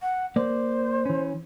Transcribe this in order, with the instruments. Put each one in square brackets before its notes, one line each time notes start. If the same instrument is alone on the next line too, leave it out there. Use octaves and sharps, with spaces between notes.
[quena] F#5
[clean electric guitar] A#3 D5 [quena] C5
[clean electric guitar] E3 C#4